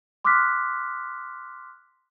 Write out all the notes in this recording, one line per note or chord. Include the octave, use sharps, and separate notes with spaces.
C6 D6 D#6 F6 F#6 B6